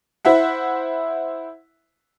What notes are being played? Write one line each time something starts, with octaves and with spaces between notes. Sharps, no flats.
E4 C5 E5 F#5